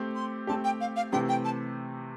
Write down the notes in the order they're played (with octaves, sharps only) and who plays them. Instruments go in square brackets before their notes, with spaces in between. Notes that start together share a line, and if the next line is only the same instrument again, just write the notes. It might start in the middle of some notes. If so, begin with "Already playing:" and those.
Already playing: [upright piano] A3 C4 G4
[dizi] C6
[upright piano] A3 C4 G4 [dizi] A5
[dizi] G5
F5
F5
[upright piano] C3 E3 A3 C4 G4 [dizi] G5
[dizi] G5
A5